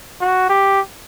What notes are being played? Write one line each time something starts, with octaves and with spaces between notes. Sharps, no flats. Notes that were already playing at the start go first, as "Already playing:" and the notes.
F#4
G4